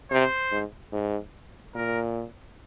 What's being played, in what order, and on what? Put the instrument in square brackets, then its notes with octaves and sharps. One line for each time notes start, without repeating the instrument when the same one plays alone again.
[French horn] C3 [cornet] C5
[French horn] G#2
G#2
[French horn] A#2 [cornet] A#4